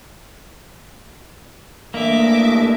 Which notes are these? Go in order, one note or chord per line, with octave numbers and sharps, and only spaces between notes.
G2 E3 A3 A#3 D4 D#5 E5 D6